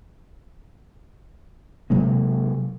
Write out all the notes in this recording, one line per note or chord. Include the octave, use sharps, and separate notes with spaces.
C3 F#3 G#3 A#3